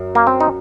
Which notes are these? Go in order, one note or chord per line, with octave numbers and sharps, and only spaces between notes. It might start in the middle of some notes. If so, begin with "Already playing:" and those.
Already playing: F#2
A#3
C4
D#4